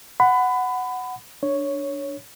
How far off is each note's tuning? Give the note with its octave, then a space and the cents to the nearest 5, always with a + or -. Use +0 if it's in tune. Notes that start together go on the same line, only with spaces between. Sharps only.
F#5 +0 B5 +25
D4 +0 C#5 +0